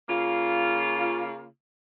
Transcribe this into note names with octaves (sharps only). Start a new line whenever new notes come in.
C#3 A#3 F4